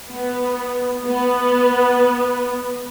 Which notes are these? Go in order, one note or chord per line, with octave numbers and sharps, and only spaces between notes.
B3
B3